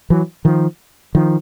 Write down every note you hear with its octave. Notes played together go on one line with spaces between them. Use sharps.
E3 F#3
D#3 F3
D#3 F3